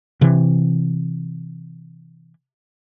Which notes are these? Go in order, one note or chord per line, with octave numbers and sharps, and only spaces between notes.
C3 E3